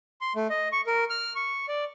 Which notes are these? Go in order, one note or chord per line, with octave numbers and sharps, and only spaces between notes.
C6
A3
D#5
C#6
A#4
F6
C#6
D5